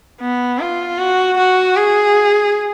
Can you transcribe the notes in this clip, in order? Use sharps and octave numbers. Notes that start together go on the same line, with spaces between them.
B3
F4
F#4
F#4
G#4